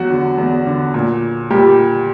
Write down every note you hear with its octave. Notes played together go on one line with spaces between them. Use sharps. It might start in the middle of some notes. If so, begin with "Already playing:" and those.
Already playing: E2 F#3 F#4
D3
E2
D3
A#2
A#2 G3 G4